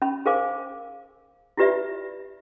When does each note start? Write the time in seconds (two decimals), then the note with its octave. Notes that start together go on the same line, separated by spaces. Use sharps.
0.02 C#4 B5
0.26 G#4 A#4 C5 F5 G#5 D6
1.57 E4 F4 G4 B4 D5 E5